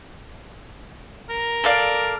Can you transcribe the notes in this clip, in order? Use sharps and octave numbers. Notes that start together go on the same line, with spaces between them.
A#4
A4 D5 F5